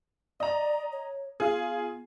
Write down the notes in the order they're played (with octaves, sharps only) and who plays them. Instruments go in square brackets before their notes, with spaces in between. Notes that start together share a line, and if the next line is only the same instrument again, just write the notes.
[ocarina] D5 [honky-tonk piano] D#5 A#5
[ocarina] C#5
[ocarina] B3 [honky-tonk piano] F4 G#4